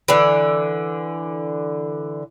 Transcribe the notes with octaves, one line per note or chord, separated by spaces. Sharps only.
D3 E3